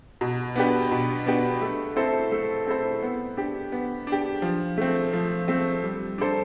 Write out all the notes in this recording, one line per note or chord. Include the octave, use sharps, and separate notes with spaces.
B2
B3 D4 G4 B4
B2
B3 D4 G4 B4
A3
C4 E4 A4 C5
A3
C4 E4 A4 C5
B3
D4 G4
B3
D4
G4
F3
A3 C4
F3
A3 C4
G3
D4 A4 C5